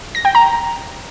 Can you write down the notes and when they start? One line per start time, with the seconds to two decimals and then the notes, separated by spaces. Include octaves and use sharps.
0.15 A#6
0.25 G5
0.35 A#5